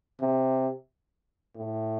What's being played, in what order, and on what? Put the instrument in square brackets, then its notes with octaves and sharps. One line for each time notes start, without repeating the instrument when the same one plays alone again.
[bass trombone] C3
A2